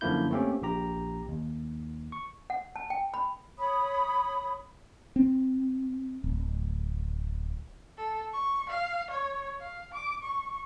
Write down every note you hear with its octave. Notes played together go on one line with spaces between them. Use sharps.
F#2 D3 F3 A#3 E4 G6
A3 A#3 C4 C#4 G4
A#1 A#2 G4 A#5
D#2
C#6
F#5
A5
G5
B5
C#5 B5 D#6
C4
D1
A4
C#6
F5
C#5
F5
D6
C#6